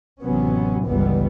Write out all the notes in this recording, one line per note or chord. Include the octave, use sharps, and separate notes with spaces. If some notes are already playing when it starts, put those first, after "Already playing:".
A1 C3 F#3 B3 C#4
G1 C#2 E3 G3 B3